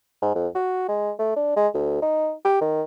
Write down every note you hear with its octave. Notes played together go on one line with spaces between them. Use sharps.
G#2
F2
F#4
G#3
A3
D4
G#3
D2
D#4
G4
D#3